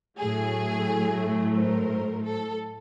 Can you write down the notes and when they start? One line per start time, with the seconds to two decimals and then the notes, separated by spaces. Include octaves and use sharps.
0.19 A2 F#3 A3 G#4
1.55 A#4 C5
2.23 A4